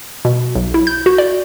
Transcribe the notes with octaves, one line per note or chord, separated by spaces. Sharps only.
B2
B1
E4
G6
F#4
D5